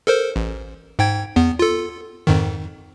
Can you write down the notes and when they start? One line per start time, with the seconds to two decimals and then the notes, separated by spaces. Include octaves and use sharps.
0.07 A4 A#4 C5
0.36 A1
0.99 G#2 G5 G#6
1.36 E2 B3
1.59 F4 A4
2.27 F2 G#2 D#3